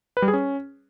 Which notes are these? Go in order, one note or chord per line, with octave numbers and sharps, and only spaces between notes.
B4
G3
G#4
C#4